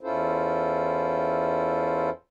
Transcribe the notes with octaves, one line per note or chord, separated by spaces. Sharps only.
E2 C#4 E4 F4 A4 C5